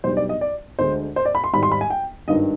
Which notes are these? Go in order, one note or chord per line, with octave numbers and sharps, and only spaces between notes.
B1 B2 G3 D4 C5
D5
D#5
D5
D2 D3 G#3 C5
C5
D5
B5
C6
G#1 G#2 G3 B5
C6
B5
G#5
G5
G#1 G2 D#3 D#5